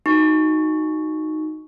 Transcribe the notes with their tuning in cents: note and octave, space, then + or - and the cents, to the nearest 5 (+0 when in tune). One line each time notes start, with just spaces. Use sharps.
D#4 +0 F#4 +0 C#6 +0